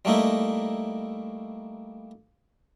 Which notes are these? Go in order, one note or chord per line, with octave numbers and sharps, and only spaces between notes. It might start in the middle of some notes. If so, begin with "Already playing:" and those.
G3 A3 A#3 D#4 E4